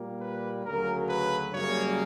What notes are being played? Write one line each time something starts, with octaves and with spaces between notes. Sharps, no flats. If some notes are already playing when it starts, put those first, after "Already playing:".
Already playing: A#2 G3 A#3
B4
D2 C#3 F#3 A#4
B4
F#2 C#3 G3 A#3 C#5